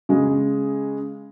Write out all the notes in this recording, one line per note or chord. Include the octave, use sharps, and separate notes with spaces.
C#3 G#3